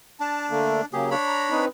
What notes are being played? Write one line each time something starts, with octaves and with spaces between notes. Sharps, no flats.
D4 A5
D3 A3 A#3
C#3 F#3 A#3 G4 G#4
D4 C#5 B5
A#5
C4 D#4 B4